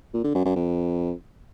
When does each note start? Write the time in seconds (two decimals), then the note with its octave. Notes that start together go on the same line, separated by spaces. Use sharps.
0.14 A#2
0.24 D3
0.35 F#2
0.45 F#2
0.56 F2